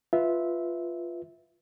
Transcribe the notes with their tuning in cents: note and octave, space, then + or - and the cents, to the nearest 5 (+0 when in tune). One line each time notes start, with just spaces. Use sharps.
F4 -5 B4 +0 E5 -15